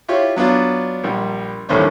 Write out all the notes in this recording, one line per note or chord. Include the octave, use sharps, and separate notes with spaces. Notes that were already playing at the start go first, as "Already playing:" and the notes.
E4 F4 G4 C#5
F#3 B3 D4 F4 D5
A#1 G3
A1 D#2 D3 G3 C5 C#5